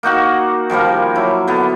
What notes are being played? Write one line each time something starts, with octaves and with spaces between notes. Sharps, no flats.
A#3 D#4 F#4 F#5
D#3 F3 G3 A#3
F#3 E4
D3 B3